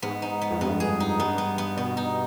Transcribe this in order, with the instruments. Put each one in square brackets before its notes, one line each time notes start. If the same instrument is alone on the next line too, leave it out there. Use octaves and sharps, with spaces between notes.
[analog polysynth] G#2 [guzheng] B3
[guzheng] D#4
B3
[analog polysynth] F2
[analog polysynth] G2 [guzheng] B3
[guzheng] G#4
D#4
[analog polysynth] G2 [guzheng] B3
[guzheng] B3
B3
[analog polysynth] B2 [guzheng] B3
[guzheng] D#4